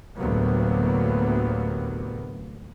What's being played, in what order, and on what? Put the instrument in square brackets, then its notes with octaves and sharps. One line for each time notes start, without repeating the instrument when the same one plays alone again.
[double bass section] D2 A2 C3 F#3 A#3 B3